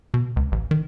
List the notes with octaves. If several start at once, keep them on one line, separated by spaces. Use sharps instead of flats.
B2
C#2
A1
D#3